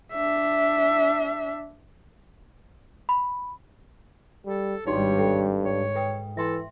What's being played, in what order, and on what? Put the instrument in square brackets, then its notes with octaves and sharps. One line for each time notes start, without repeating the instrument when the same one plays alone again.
[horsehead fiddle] D4 E5
[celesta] B5
[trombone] G3 [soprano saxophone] A4
[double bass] G#1 G3 [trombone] G2 [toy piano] D#4 F#4 C6 [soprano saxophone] C#5
[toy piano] A4 G5
[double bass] G#2 [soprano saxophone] C#5
[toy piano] B4 G5 D#6
[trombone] E3 [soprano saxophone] A4 [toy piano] E5 C6